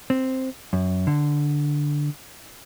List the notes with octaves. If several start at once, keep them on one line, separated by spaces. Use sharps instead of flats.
C4
F#2
D3